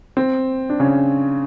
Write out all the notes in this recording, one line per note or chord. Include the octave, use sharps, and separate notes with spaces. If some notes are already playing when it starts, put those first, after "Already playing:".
C4
D4
C#3 C#4